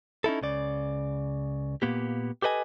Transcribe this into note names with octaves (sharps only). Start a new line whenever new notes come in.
C#4 D#4 E4 A4
C#2 C#3 D5
A#2 A#3 B3 G4
G4 A4 B4 D#5 G#5